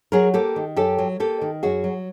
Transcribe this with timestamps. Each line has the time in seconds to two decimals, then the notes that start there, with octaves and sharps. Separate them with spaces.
0.12 F#3 G#4 A#4
0.34 A#3 G4 A4
0.56 D#3
0.76 F#2 G4 A4
0.98 F#3
1.20 A#3 G4 A4
1.41 D#3
1.63 F#2 F#4 G#4
1.84 F#3